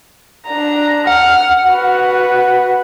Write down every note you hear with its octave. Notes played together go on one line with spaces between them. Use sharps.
D4 A#5
F#5 F6
F#4 B4